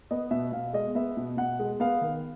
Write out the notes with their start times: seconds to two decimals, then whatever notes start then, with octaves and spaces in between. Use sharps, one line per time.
0.11 B3 D#5
0.31 B2 E5
0.52 B2 F5
0.73 G#3 D#5
0.95 B3 E5
1.17 B2
1.37 B2 F#5
1.59 G#3
1.80 B3 F5
2.01 D#3